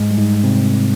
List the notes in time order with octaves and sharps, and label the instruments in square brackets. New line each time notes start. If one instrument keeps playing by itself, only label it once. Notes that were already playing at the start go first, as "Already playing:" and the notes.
Already playing: [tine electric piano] G#2 G#3
G3
G#2 G#3
C3 C4